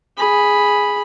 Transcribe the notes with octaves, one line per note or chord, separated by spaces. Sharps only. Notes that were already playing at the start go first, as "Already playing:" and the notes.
G#4 B5